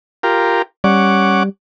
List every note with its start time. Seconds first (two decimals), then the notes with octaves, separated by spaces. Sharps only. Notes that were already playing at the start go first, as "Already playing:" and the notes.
0.23 F4 G4 A#4
0.84 G3 C#4 F#5 D6